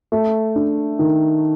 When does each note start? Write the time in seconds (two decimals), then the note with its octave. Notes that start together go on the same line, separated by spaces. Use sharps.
0.12 A3
0.56 D4
0.99 D#3